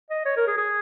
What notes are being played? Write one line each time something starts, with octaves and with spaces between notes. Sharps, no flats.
D#5
C#5
A#4
G#4
G#4